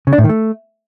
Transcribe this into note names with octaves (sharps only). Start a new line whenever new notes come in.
C#3
D4
A2
D#3
A3